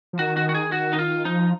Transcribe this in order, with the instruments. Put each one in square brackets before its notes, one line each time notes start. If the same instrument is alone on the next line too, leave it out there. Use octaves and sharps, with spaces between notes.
[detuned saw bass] F3
[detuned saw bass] D#3 [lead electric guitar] F#4
[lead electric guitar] F#4
F#4
G#4
F#4
D#4
F4
[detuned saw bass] F3 [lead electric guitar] D#4